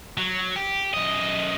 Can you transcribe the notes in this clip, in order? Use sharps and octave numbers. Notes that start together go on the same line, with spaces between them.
F#3
G4
F#2 D#5